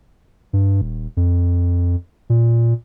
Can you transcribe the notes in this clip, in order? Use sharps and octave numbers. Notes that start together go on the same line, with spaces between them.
G2
D#1
F2
A#2